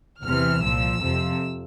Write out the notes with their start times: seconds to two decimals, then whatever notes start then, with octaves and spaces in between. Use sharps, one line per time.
0.23 E2 C3 E3 F6
0.61 C2 A#2 F3 E6
1.01 F2 C3 F3